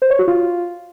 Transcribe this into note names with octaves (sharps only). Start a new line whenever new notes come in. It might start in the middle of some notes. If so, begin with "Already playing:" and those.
C5
C#5
F#4
F4